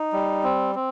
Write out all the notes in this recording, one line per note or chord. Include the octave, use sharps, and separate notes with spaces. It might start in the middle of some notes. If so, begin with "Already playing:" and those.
Already playing: D#4
G3
C4
C4